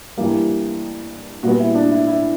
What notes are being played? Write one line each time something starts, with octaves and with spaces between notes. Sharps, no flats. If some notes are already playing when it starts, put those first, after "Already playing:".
G2 E3 G3 A#3 G4
A#2 G3 B3 F#4
E4
D4
E4
E4